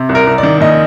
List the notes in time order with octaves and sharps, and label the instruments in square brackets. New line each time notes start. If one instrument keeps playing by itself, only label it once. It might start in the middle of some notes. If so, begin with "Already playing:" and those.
Already playing: [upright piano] C3
C2
A#4
C2
D5
D#3
A#1 D#5